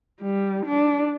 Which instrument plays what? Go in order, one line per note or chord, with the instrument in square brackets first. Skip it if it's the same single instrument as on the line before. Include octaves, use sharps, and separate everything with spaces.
[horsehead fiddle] G3
D4